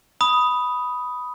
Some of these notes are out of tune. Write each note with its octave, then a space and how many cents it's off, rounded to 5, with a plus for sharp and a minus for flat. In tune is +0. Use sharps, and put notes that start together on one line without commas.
B5 +0 D#6 +5